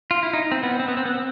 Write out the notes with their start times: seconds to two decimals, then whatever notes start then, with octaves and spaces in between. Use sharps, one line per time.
0.11 F4
0.23 E4
0.33 D#4
0.52 C4
0.63 B3
0.80 C4
0.88 B3
0.97 C4
1.05 B3
1.14 C4